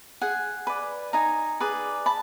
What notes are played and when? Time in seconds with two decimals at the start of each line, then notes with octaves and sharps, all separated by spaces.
0.21 G#4 F#5 G#5
0.67 B4 D5
1.13 D#4 G#5 A#5
1.60 G#4 B4 D5
2.06 A5 B5